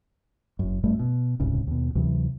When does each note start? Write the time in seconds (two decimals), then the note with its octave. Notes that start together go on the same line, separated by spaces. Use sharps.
0.59 F#1 F#2
0.83 G#1 F#2 G3 A3
0.99 B2
1.40 D#1 C2 G#2 C#3
1.67 D#2 B2
1.95 D2 C3 E3 F#3